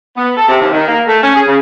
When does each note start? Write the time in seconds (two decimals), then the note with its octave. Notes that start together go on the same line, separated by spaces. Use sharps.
0.16 B3
0.36 A4
0.49 C3
0.61 D#2
0.73 D#3
0.88 A#3
1.07 A3
1.22 C#4
1.35 G#4
1.47 C#3